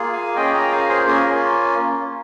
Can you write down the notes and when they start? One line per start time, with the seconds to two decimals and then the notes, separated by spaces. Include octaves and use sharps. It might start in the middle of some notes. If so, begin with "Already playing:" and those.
Already playing: A#3 F4 G#4
0.13 F5 G#5
0.36 A#3 C#4 F4 G#4 D#5 G5
0.54 G5 A#5
0.71 F5 G#5
0.89 G#4 C5
1.06 A#3 C#4 F4 G#4 A#4